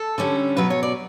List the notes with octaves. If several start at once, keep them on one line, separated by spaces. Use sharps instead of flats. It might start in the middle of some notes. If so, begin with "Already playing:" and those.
Already playing: A4
D3 G3 C#4
B2 F#3 B3 B4
C#5
D5